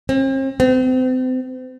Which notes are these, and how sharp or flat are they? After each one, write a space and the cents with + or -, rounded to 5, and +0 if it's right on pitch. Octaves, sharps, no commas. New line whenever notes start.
C4 +45
C4 -35